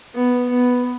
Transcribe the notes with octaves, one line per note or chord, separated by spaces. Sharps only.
B3
B3